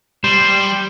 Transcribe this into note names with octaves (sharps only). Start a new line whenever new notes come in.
G3 C5